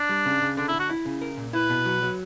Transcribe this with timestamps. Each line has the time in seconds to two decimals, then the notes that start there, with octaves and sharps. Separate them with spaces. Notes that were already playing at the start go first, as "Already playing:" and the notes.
Already playing: D4
0.09 G3
0.26 C#3
0.42 C#3
0.57 D3 D4
0.68 E4
0.74 D3
0.79 F#4
0.90 E4
1.06 C#3
1.22 A#4
1.37 A#2
1.53 E4 B4
1.69 B2
1.85 F#3
2.02 F#3